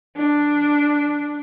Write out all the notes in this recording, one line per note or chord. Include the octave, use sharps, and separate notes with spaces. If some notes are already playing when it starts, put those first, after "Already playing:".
D4